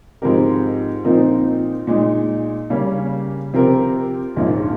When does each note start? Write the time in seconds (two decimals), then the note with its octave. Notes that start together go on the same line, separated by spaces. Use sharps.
0.22 G#2 F3 C4 G4 A#4
1.05 A#2 F3 C4 D#4 A#4
1.87 A#2 G#3 D#4
2.70 C#3 G3 A#3 C#4
3.54 C3 F3 C4 G4 A#4
4.36 A#1 G#2 F3 A#3 C#4